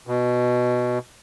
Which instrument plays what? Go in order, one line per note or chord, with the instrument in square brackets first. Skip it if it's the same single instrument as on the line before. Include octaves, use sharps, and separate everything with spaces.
[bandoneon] B2